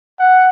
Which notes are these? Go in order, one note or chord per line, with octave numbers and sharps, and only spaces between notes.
F#5